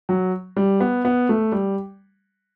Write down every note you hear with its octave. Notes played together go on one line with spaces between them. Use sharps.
F#3
G3
B3
B3
A3
G3